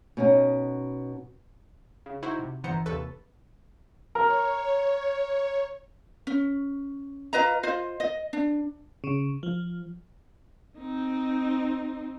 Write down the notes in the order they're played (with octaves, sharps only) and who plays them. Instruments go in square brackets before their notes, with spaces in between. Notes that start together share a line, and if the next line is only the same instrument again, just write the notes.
[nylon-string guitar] B2 C#4 D#4
[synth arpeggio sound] C#3
D#4 E4 F#4 C5
C3
G1 E3 B3 C5 A#5 C#7
D#2 C3 A4 B4 C#6 A6
[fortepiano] A#4 [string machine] C#5
[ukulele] C#4
F4 B4 D#5 A#5
F4 C5 D#5
D#5
D4
[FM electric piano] C#3
F3
[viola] C4 D#4